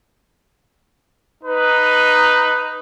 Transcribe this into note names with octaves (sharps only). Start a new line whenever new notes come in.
D#4 B4